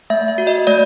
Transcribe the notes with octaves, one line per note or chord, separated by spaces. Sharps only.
A3 E5
E5
F#4
D#5
A3 D5